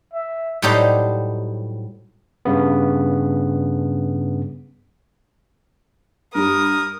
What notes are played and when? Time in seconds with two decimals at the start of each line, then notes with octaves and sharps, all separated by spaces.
0.13 E5
0.62 A2 F#3 G3 D#4 G4 C5
2.45 G2 C#3 B3
6.35 G2 G3 A#4 D#6